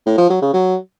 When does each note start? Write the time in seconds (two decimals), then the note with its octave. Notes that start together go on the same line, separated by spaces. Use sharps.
0.06 A2
0.18 F3
0.30 F#3
0.42 C#3
0.54 F#3